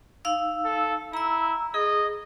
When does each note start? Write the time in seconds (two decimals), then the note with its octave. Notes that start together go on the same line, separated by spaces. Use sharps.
0.25 D#4 F5 E6
0.65 A4
1.13 E4 A#5 E6
1.74 G#4 D#5